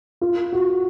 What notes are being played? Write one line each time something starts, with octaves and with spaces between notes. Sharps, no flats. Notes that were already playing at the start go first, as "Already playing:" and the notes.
F4
F#4